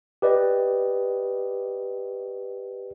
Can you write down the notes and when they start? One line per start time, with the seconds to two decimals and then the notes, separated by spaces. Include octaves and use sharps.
0.22 G4 B4 D5 D#5